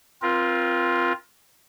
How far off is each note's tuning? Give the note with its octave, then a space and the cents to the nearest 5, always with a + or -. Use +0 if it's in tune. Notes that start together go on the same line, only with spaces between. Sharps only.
C4 +0 F4 +0 A#4 +35